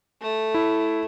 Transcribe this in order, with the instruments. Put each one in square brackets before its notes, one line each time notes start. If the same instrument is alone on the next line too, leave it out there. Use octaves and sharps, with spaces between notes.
[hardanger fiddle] A3
[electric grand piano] E4